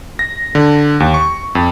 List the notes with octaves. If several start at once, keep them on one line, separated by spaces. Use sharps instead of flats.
A#6
D3
D#2
C#6
F2